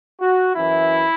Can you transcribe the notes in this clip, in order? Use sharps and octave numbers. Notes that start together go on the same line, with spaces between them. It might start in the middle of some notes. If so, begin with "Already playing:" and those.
F#4
F#2 E3 E4